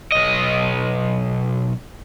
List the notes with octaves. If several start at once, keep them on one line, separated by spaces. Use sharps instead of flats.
B1 D#5